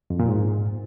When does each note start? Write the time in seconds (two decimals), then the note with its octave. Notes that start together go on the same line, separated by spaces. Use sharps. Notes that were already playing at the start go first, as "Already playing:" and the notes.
0.10 F2
0.19 A#2
0.29 G#2